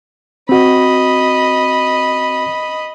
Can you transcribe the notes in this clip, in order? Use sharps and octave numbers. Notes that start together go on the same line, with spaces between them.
C4 F#4 D#5 B5